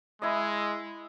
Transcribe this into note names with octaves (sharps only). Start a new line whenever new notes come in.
G#3 E4 D#5